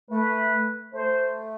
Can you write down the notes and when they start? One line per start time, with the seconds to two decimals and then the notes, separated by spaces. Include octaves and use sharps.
0.11 A3 B4
0.94 A3 C5